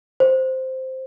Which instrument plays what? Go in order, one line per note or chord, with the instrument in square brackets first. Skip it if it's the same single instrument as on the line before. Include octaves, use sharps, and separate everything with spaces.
[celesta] C5